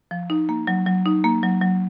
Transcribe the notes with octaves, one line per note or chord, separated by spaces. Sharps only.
F3
D#4
A#3
F#3
F#3
D#4
A#3
F#3
F#3